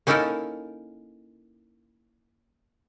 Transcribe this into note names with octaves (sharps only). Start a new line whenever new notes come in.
A#3 C#4 D#4 E4 A4 A#4